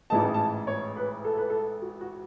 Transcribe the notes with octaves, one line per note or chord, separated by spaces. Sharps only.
A1 G#2 E3 G#3 D#4 A5
A5
C#5
B4
A4
B4
A4
F#4
F#4